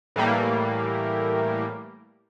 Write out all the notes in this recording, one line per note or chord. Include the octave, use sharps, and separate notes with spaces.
A2 E3 G3 A#3